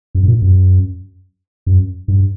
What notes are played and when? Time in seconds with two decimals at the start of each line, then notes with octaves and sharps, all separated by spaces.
0.15 F#2
0.23 G2
0.28 A#2
0.42 F#2
1.67 F#2
2.08 G2